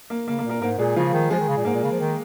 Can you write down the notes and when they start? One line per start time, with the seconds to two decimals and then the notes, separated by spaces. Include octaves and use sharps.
0.10 A#3
0.27 C#3 A#3
0.39 A#3
0.44 A#2
0.50 A#3 A#4
0.61 G#2 A#3 A#4
0.78 A#2 G#3 G#4
0.96 C#3 F3 F4
1.14 D#3
1.30 F3 G#3 G#4
1.39 D#3
1.48 C#3
1.57 A#2
1.65 G#2 A#3 A#4
1.74 A#2
1.83 C#3
1.91 F3
2.00 D#3